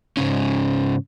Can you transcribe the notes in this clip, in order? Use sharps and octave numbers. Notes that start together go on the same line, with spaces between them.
G#2 C#3 C#4